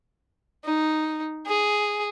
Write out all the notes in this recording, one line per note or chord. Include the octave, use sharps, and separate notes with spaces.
D#4
G#4